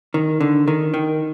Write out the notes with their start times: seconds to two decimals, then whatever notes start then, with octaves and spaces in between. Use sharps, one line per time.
0.14 D#3
0.41 D3
0.68 D#3
0.94 D#3